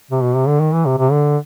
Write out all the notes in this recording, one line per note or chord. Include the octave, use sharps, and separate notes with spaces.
C3
B2
C3
D3
D#3
E3
C3
C3
D3